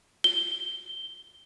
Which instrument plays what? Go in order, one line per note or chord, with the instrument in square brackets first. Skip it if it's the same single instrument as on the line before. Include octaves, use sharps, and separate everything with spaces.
[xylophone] G7